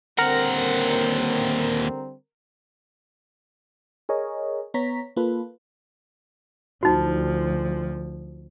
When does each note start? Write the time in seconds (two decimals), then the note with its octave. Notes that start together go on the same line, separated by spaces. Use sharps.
0.18 D#2 D3 G3 C4 A#4 F#5 A#5
4.09 G#4 A#4 C#5 D#5
4.74 B3 C#5 A#5 B6
5.16 A#3 F4 A4 B4
6.83 D2 F3 D#4 F#4